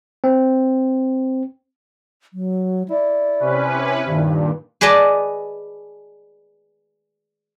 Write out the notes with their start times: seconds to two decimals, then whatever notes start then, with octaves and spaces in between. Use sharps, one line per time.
0.24 C4
2.34 F#3
2.90 E4 D5
3.39 C3 C#4 B4
4.06 G2 A#2 D#3
4.81 G#4 B4 D5 D#5 A5